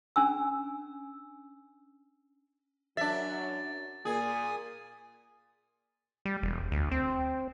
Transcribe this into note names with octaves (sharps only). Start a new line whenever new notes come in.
C#4 D4 G#5 E6
F#2 F#3 D4 E5 A6
A#2 G#4 G#5 D#6
G3
E1
D2
C4